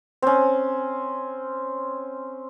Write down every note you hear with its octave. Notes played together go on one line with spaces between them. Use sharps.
C4 C#4